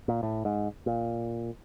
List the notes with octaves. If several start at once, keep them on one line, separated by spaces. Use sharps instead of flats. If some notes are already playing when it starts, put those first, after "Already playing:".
A#2
A2
G#2
A#2